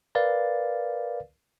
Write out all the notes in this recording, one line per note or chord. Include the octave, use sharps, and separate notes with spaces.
A#4 B4 D5 F5 A6